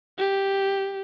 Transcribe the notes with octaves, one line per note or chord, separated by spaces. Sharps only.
G4